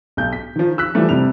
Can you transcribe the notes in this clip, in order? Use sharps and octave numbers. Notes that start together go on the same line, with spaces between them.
B1 G6
B6
D#3 F3
E6 F#6 B6
E3 F3 G3 A3
F2 C3 G3 F7